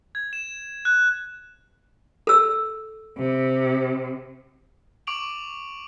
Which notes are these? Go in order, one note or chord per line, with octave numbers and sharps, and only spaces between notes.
G#6
E7
F#6
A4 E6
C3
C#6 D6 D7 F7 F#7